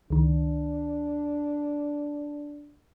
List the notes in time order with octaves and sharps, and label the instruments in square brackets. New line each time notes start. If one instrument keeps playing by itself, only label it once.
[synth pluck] C#2 D#3 [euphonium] D4